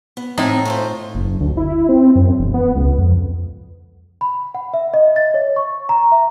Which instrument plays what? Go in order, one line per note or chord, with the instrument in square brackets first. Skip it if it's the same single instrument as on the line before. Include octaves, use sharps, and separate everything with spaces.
[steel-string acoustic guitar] B3
[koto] A2 D#4 [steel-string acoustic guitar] C4 D#5 G#5
[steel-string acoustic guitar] A3 F4 C5
[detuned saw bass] F#1
D2
E4
C4
F#2
E1
B3
C#2
F2
[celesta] B5
F#5
E5
D#5
A6
C#5
C#6
A#5
E5